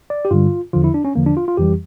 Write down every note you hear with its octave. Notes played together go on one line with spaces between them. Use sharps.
D5
G4
G2 D3 G3 F4
E2 D3 F3 F4
E4
D4
C#4
E2 D3 F3 A#3
D4
F4
F4
F2 E3 G3 G4